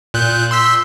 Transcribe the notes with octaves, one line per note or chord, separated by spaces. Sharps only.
A#2 F#6 G6
C6 E6 B6